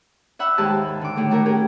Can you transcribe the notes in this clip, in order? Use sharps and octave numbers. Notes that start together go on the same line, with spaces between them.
E5 F#5 B5 E6 F#6
D#2 G#2 G4 A5
D3 D6
A2 D#3 A3
A3 F#4 A#4
C#4 G4 G#4 A#4